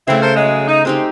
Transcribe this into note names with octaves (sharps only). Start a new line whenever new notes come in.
C#3 E3 A3 C4 E4
A4 A#4 C5
F#3 G#3
D#4
G#3 C4 D#4 G4 D#5